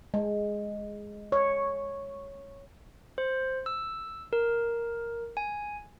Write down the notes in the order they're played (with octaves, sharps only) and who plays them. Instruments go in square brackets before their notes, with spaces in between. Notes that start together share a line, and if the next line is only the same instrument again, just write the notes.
[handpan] G#3
C#5
[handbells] C5
E6
A#4
G#5